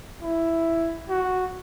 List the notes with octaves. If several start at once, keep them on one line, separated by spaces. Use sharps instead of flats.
E4
F#4